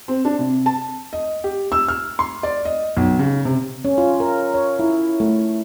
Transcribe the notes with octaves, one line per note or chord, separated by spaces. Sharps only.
C4
D4
C3
A5
D#5
G4
E6
F6
C6
D5
D#5
B1
C#3
C3
C#4
F4
A#4
C#5
E4
A3